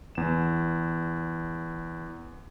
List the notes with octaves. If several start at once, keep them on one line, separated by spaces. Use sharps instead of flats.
E2 E7